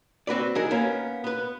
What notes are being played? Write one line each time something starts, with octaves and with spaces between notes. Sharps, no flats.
C4 F#4 B4 D5
F#3 D#4 E4 G#4 A#4
A#3 B3 C#4
B3 B4